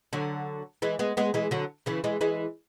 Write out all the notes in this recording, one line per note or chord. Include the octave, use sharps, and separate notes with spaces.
D3 F#3
E3 G#3
G#3 B3
G#3 B3
E3 G#3
D3 F#3
C#3 E3
E3 G#3
E3 G#3